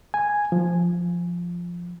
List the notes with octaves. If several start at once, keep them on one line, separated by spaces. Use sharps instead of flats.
G#5
F3